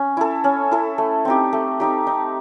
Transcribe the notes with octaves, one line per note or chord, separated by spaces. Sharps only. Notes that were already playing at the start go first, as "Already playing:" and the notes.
Already playing: C#4
E4 A4
C#4
E4 A4
A3
C4 D#4 G4
A3
C4 D#4 G4
D#4